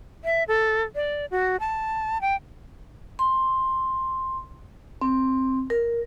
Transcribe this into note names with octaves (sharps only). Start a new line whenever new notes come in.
E5
A4
D5
F#4
A5
G5
C6
C4
A#4